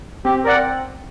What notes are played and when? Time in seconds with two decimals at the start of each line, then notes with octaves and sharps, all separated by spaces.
0.25 C4 G4
0.44 A#4 D5 F#5